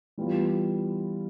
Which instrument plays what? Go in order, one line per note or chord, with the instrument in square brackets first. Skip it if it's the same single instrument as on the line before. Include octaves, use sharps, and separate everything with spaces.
[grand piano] E3 G3 B3 F4